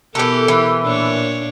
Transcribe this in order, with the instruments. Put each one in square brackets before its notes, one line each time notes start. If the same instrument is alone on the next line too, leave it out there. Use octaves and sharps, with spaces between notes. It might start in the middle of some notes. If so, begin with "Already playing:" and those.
[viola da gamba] B2 G4 A#4 [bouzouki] E3 A4
[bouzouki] E3
[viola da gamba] A#2 D4 C#5